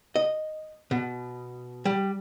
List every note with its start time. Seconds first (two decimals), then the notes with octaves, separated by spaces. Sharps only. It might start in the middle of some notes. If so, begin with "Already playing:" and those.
0.16 D#5
0.91 B2
1.85 G3